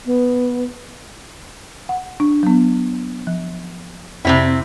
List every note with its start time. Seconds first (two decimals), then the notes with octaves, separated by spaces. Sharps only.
0.06 B3
1.89 F#5
2.20 D4
2.43 F#3 B3
3.27 F3
4.25 F2 C3 C4 E4